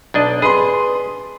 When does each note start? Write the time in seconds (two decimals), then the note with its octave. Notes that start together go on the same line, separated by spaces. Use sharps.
0.14 B1 D4 D#5
0.42 G#4 B4 C6